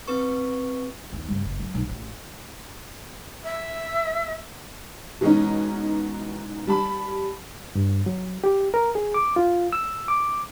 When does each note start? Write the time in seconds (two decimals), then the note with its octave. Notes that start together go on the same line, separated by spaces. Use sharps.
0.08 C4 B4 C#6
1.12 D#2 B3
1.28 G2 C#3
1.45 F#1
1.60 F#2
1.75 B1
1.89 A1
3.43 E5
5.21 B2 E3 G#3 C#4 D#4
6.67 G3 A5 B5
7.75 G2
8.06 F#3
8.44 G4
8.74 A#4
8.95 G#4
9.14 D6
9.36 F4
9.73 E6
10.08 D6